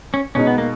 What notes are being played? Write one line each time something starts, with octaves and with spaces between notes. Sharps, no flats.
C#4
B2 G#3 C#4 D#4
B3
A#3